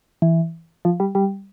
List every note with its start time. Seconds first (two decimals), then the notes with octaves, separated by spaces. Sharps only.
0.22 E3
0.85 F3
1.00 G3
1.15 G3